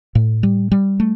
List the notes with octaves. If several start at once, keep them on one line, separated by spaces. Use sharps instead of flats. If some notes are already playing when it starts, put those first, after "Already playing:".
A2
G3
G3
A3